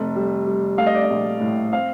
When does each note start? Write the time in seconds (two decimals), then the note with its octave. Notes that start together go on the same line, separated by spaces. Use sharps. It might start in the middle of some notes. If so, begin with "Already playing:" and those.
Already playing: F1 A3
0.16 G3
0.46 G3
0.78 A3 F5
0.86 D#5
0.95 D5
1.03 D#5
1.10 A#1
1.41 A2
1.72 C4 F5